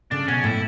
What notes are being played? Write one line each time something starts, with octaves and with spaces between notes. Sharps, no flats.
C#3 D4
B2 C#4
A2 E4